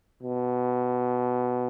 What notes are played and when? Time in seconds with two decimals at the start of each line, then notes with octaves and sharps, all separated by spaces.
0.23 B2